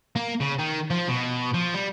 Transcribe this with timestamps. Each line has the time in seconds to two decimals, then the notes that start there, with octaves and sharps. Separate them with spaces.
0.16 A#3
0.41 C#3
0.59 D#3
0.90 F3
1.08 B2
1.54 F3
1.74 G3